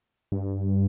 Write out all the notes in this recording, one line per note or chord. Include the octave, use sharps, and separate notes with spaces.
G2